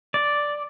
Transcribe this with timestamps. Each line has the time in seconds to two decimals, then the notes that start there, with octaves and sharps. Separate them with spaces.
0.14 D5